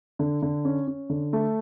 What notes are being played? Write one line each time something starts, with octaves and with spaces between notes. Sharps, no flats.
D3
D3
C#4
C#4
D3
A3